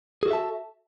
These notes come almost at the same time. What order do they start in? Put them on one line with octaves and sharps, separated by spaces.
G#4 F#4 A4 E5 A5